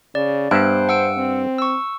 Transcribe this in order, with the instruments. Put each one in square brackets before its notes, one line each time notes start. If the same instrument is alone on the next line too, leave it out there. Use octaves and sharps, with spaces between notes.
[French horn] C#3 [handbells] D5
[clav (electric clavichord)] G2 E5 [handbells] B3 F#6 D7 [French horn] C5
[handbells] F#5 E6 D7
[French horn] C4
[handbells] C#6 E6